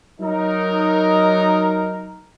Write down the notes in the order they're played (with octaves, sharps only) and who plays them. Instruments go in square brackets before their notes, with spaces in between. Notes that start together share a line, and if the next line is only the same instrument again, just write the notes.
[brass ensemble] F#3 D#4 A#4